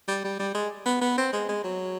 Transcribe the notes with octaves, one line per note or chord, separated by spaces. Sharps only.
G3
G3
G3
G#3
B3
B3
C4
G#3
G#3
F#3